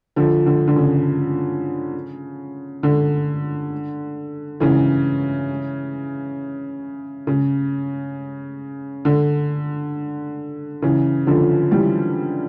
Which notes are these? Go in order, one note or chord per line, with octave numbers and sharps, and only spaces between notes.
D3 F3
D3
D3
C#3
D3
C#3 E3
C#3
D3
C#3 E3
D3 F3
E3 G3